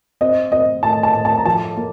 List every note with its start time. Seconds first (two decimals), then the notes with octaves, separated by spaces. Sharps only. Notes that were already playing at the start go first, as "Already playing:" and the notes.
0.21 C4 D#5
0.52 C4 D#5
0.83 A2 A5
1.03 A5
1.15 A2
1.25 A5
1.38 A#5
1.45 F3 A5
1.77 A#3